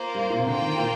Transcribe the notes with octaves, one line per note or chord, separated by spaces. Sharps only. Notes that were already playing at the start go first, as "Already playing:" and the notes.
Already playing: A#3 F4 C5
G3
A#2
C3
D3 A#3 F4 C5 G5
D#3
A#2